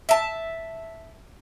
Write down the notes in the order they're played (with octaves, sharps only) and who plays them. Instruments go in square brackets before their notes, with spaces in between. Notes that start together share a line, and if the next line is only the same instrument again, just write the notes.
[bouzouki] E5 A5